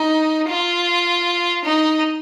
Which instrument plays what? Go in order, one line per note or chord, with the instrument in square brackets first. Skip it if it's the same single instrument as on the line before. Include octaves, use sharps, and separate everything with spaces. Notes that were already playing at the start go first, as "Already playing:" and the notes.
Already playing: [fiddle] D#4
F4
D#4